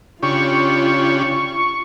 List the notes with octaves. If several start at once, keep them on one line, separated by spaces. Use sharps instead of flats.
C#3 D4 F4 G4 C#6